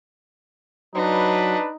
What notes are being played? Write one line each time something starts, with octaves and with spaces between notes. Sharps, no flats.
F#3 D4 D#4 B4